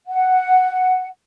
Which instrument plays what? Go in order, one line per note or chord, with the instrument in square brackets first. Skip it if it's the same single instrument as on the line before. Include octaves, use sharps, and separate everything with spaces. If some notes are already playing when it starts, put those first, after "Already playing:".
[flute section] F#5